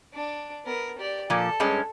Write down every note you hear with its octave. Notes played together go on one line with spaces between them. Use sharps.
D4 D6
B3 A#4
G4 D5
A#2 F3 A4
G2 G#3 C#4